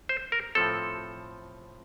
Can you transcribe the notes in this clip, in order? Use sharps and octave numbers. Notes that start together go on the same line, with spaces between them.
C5
A#4
A2 F3 C4 A4